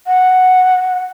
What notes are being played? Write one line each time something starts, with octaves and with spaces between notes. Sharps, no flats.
F#5